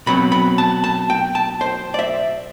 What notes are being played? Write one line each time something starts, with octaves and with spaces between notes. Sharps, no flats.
B2 F#3 C4 B5
B5
A5
A5
G5
A5
C5
D5
E5